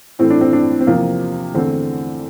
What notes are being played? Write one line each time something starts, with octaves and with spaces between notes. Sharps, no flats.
A2 E3 A3 C4
D4
C4
D4
C4
E2 C3 F3 A#3
E2 D3 A3 C4